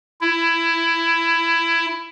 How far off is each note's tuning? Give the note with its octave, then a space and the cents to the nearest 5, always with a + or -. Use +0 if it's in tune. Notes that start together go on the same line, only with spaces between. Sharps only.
E4 +15